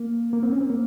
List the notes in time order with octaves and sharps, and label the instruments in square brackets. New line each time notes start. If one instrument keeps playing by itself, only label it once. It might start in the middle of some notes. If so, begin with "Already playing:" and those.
Already playing: [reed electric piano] A#3
A#3
C4
C#4
C4
A#3